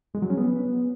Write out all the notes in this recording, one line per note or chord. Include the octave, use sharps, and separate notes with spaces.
G#3
F#3
C#4
B3